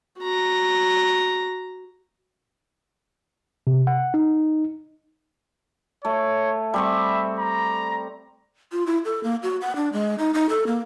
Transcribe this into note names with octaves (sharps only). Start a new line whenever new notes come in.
F#4 A#5
C3
F#5
D#4
A3 C#5
G3 C4 E5 C#6
A#5
F4
E4
A4
A#3
F#4
F#5
D4
G#3
D#4
D#4
A4
A#3